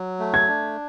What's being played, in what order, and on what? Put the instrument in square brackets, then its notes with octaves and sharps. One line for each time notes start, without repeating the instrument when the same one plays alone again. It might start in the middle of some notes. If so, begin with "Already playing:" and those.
Already playing: [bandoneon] F#3
A3
[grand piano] G#6
[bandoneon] D4